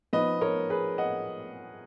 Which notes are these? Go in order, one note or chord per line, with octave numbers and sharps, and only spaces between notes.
F3 B3 D#4 B4 D#5
A#4 C#5
G#4 B4
D#5 F#5